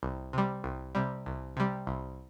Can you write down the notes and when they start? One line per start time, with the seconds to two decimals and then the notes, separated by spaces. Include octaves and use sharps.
0.03 C2
0.33 C3 G3
0.64 C2
0.95 C3 G3
1.26 C2
1.57 C3 G3
1.87 C2